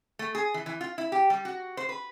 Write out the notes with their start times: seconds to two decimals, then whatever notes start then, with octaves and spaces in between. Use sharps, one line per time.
0.19 A3
0.35 G#4
0.54 E3
0.66 E3
0.81 F4
0.98 E4
1.12 G4
1.30 G3
1.45 F#4
1.77 C5
1.89 B4